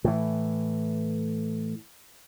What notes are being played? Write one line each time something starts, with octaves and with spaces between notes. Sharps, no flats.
A2 E3